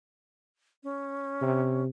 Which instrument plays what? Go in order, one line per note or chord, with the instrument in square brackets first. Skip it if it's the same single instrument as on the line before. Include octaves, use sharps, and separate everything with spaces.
[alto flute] C#4
[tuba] C3